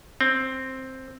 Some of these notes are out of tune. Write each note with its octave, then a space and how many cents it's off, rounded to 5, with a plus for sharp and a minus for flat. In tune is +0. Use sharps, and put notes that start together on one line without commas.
C4 +5